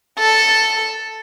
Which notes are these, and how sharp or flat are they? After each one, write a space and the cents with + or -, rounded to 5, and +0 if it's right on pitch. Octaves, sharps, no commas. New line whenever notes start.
A4 +5